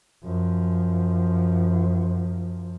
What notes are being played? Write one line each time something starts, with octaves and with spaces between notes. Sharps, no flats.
F#2 F3